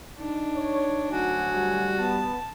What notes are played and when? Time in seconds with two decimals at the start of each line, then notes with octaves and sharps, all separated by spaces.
0.19 D4 D#4
0.56 C#5
1.11 D2 F#3 F#4 G#5
1.54 G3
1.99 B3 A5